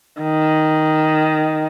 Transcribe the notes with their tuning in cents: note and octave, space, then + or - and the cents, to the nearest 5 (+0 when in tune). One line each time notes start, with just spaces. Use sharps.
D#3 +0